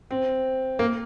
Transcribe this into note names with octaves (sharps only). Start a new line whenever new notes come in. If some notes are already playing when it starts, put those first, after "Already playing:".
C4
A#3